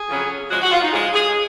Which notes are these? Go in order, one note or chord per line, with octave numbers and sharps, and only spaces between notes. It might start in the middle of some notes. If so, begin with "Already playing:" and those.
Already playing: G#4
F2 C#3 F#3 C#4
C#3 F3 G#3 F#4
F#4
F4
D#4
C#3 F3 G#3 G#4
G#4